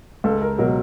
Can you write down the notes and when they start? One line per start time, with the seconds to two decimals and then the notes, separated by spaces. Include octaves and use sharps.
0.24 C#2 A4
0.42 A#4
0.58 B2 F#3 A#4